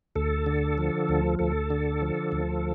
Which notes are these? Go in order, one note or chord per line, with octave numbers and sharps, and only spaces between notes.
D2 A4
D3
F3
D2
D2 A4
D3
F3
D2